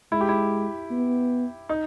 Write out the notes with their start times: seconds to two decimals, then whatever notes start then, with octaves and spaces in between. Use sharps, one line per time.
0.12 G#3 E4
0.21 G4
0.29 E4
0.91 B3
1.69 D#4